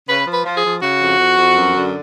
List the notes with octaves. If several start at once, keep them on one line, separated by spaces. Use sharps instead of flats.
C#3 B4
F3
B4
F3
G#4
F3
C#3 F#4
F2
F2
F2
F#2
D3